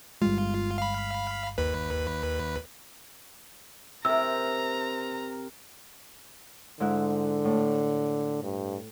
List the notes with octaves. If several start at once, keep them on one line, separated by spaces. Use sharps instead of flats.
G1 G3 G#3 F4
F5 B5
D#2 B4
C3 A#4 A#5 E6
G#2 D3 E4 F#6
A2
G2